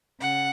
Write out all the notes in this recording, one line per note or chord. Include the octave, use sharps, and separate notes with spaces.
C#3 F#5